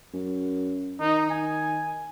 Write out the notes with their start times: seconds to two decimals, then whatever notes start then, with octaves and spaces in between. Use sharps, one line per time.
0.14 F#2
1.00 D#3 D#4
1.30 G#5